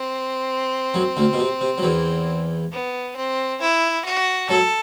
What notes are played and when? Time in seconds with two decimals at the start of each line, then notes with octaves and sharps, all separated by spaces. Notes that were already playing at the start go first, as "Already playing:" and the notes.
Already playing: C4
0.94 F#2 F#3
1.17 D2 D3
1.33 B2
1.39 C3
1.61 C3
1.78 F#3
1.83 E2 E3
2.72 B3
3.16 C4
3.61 E4
4.05 F#4
4.49 F#2 F#3 A4